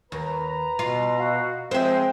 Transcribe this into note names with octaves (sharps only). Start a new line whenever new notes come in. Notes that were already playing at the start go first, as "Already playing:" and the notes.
D#2 B4 A#5
B2 F4 C6
F#4 F5
F3 G#3 C4 C5 E5 G5